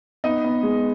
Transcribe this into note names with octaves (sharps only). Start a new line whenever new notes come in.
B3 D#4 D#5
B3
G#3